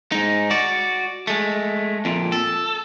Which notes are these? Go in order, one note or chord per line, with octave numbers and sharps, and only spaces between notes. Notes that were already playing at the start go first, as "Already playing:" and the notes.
G#2 D#4
F#4 D5
G#3 A3
F2 A#2
A4